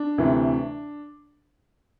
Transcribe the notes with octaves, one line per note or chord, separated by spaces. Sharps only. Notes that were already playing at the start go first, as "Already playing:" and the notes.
Already playing: D4
D2 C3 E3